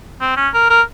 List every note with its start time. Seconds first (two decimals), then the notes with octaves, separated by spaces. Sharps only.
0.21 C4
0.36 C#4
0.54 A#4
0.70 A#4